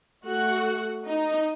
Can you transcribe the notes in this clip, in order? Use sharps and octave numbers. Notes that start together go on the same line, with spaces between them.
A3 F#4 F#5
D#4